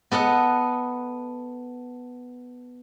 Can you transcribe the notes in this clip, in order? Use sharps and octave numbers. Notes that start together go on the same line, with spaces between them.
B3 A4 D#5 F#5